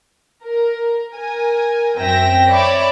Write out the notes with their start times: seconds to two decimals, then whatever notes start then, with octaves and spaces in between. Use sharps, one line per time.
0.45 A#4
1.16 A#4 G#5
1.98 F#2 C4 E5 G5 A#6
2.51 C#5 D5 E5 B5 D6